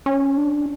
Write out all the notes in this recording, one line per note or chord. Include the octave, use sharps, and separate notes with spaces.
C#4
D4